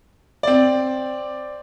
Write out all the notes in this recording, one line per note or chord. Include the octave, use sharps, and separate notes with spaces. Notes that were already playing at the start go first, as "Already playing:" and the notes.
C4 D5